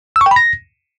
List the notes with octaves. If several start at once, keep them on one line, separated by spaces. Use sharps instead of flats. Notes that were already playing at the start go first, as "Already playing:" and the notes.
E6
C#6
G5
B5
A#6